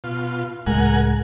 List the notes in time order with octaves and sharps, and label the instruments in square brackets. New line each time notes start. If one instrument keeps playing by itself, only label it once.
[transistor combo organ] B2 F4
[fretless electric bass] C#2 A2 G#3 [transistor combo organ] A#4 F#5 G#5